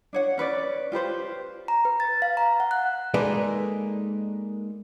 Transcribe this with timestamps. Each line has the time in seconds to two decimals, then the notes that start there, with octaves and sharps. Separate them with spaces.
0.13 D4 C#5 F#5
0.38 C#4 B4 C5 D5
0.92 F4 G4 B4 C5
1.68 A#5
1.85 B4
2.00 A6
2.22 F5
2.37 A#5
2.60 F#5
2.71 F#6
3.14 G#3 A#3 D#4 A4 B4 D5